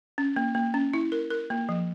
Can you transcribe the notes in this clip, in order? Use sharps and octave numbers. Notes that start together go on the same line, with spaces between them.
C#4
A#3
A#3
C#4
E4
A#4
A#4
A#3
F3